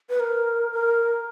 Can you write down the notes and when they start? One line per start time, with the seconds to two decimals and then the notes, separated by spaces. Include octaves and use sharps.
0.10 B4
0.20 A#4
0.72 A#4